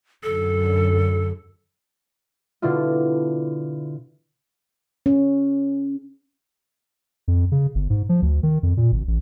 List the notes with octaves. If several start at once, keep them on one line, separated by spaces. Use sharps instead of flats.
F#2 D3 A4
B2 D3 D4 E4 F4
C#4
F2
C#3
G1
G#2
F3
D2
D#3
F2
A#2
G#1
A1